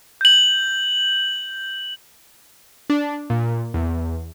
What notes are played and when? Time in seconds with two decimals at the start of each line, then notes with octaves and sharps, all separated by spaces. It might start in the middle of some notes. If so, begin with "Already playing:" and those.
0.21 G6 F#7
2.90 D4
3.30 A#2
3.74 E2